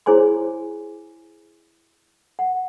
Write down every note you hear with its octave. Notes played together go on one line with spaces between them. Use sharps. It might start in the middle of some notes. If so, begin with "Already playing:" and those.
E4 G#4 C5 C#5 G#5 C6
F#5